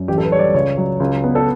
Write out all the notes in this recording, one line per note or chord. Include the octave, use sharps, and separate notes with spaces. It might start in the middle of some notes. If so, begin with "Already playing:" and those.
Already playing: F#2
A1 G4
A4
B4
G3 C#5
D5
C#2 C#5
F#3
C#2
B3
A4